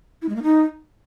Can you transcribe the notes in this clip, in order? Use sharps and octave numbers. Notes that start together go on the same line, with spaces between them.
E4
G#3
A#3
D#4